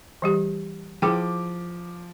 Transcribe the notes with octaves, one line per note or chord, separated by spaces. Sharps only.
E3 G3 G4
F3 E4 G#4 G5 D6